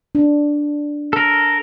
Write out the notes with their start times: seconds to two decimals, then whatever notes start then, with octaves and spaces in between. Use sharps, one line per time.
0.15 D4
1.13 A4 A#4